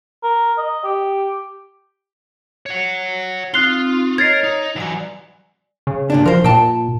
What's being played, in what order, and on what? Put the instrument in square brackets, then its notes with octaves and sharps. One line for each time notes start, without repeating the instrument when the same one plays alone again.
[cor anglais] A#4
D#5
G4
[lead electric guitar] C#5 F#5
[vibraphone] C4 D#4 [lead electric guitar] F4 [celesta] F#6 C7 G7
[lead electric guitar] A#4 [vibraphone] C#5 D#5 [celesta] G#6 A6 C7
[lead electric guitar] D#4
[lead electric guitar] E3 F#3 [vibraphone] D5 G#5
[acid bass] C#3
[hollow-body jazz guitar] G2 A#2 D4
[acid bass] F3 [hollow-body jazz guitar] A#4 C5
[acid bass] A#2 [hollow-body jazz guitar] G5 A5